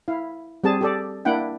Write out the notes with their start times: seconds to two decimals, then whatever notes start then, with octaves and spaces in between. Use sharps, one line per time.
0.08 E4 F5
0.64 G3 C4 G#4 A5
0.81 G4 A4 D5
1.25 A#3 D4 E4 F#5 G5